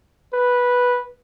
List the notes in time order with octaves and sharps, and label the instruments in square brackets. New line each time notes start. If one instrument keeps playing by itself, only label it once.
[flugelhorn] B4